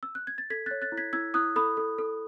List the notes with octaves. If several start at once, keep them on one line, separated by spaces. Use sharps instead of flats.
E6
F#6
G#6
A6
A4 G#6 B6
C#5 F#6 A6
F#6 A6
E4
G#6 B6
E4 E6 G#6
E4 D#6 F#6
A4 B5 D#6
A4
A4